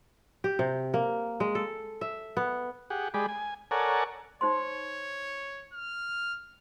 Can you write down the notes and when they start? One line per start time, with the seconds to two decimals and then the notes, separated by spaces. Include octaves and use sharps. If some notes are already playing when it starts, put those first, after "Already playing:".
0.44 G4
0.59 C3
0.94 A#3
1.40 G#3
1.55 A4
2.01 E5
2.37 B3
2.90 G4 G#4 F#5
3.14 G#3 G4 G#4 D5 B5
3.29 G#5
3.71 A4 A#4 C#5 D5 F#5 G#5
4.41 D#4 C5 C#5 C6
5.73 F6